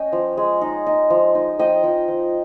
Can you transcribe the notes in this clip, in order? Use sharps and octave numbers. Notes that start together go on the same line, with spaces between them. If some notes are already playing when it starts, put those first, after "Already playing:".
Already playing: C#4 D#5 G5
F3
G#3
D#4
D#4
F3
D#4
F3 D#5 G5
F3
F3